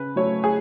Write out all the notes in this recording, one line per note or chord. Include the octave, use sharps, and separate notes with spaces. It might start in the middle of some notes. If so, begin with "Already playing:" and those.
Already playing: C#3 B4
F#3 A3 C#5
G#4